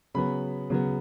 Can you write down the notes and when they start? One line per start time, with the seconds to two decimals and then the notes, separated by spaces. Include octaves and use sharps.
0.14 C#3 F#3 B3 B5
0.70 C#3 F#3 B3